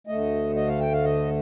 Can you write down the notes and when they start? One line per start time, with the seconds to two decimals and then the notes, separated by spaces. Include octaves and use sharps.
0.07 D2 D3 A3 D#5
0.56 D#5
0.67 F5
0.80 G5
0.92 F5
1.04 D#5